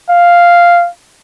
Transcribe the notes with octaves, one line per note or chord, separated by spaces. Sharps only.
F5